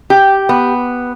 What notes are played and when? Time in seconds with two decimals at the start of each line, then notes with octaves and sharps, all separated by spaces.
0.10 G4
0.49 B3